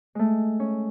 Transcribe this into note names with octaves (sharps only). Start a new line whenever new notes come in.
G#3 A3
C#4